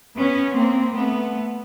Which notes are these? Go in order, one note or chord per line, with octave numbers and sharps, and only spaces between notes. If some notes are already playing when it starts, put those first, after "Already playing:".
B3 C#4
A#3 C4
A3 B3